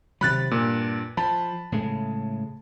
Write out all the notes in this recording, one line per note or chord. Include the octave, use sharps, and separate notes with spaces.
C3 D#3 F#3 B5 F#6 A6
G2 A#2
F3 A5 B5
A2 C#3 G#3